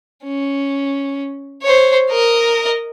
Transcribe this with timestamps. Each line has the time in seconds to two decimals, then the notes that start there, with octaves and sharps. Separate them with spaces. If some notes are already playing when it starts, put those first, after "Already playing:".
0.24 C#4
1.63 C5 C#5
2.10 A#4 D#5